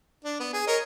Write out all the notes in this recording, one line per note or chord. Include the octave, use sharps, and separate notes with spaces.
D4
B3
G#4
A#4 C#5 D#5